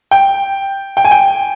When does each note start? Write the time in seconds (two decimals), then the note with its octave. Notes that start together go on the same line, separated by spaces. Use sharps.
0.11 G5
0.97 G5
1.05 G#5
1.11 G5